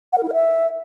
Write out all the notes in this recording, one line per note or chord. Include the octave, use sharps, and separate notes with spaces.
F#5
A#4
E4
A#4
E5